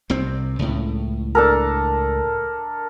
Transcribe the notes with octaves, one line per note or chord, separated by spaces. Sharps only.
C2 C3 C4
C#2 A2
D4 A4 A#4